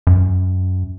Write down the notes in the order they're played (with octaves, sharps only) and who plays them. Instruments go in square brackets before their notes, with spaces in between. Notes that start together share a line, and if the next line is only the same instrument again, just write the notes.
[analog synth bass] F#2